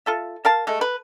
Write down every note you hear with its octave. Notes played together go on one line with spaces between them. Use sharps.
F4 A4 E5
A#4 F5 A5
G#3 A3
B4